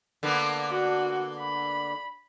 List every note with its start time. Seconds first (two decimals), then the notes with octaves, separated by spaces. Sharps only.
0.23 D3 A#3 B3
0.70 F#4
1.39 B5